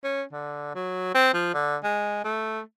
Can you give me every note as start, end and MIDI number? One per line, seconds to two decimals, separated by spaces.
0.04 0.23 61
0.33 0.72 50
0.75 1.14 54
1.14 1.33 60
1.34 1.53 53
1.54 1.77 50
1.84 2.21 56
2.25 2.60 57